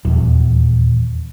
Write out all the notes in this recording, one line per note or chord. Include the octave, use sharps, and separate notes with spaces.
D#1 E2